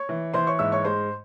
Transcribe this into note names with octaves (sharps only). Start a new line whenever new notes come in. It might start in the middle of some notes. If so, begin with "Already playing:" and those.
Already playing: C#5 C#6
E3
E3 C5 C6
C#5 C#6
G#2 E5 E6
C#5 C#6
G#3 C5 C6